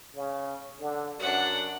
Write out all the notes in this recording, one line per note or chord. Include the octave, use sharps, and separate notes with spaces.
C#3
D3
F#2 D4 F#5